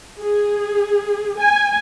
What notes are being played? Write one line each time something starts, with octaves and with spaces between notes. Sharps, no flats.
G#4
G#5